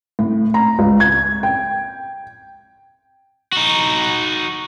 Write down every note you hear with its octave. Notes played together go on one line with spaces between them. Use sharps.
A2
A#5
C#2
G#6
G5
D#4 F#4